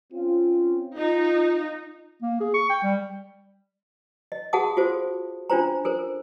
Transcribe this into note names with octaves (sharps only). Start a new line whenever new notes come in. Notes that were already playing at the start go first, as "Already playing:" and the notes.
C4 C#4 F4
D#4 F4
A#3
G#4
C#6
G5
G3
D#5
F#4 G#4 F5 F#5 A5 D#6
F4 F#4 A4 C5
C#4 D4 F4 C5 A#5
A4 A#4 C5